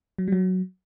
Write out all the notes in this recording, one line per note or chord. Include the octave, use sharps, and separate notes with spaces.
F#3
G3
F#3